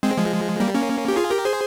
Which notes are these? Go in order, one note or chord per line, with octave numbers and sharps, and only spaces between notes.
G#3 C4
F3 G#3
G3 A#3
A#3 C#4
G4
F4 G#4
G4 A#4
G#4 C5